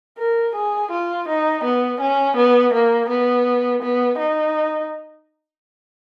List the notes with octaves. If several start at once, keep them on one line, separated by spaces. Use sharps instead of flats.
A#4
G#4
F4
D#4
B3
C#4
B3
A#3
B3
B3
D#4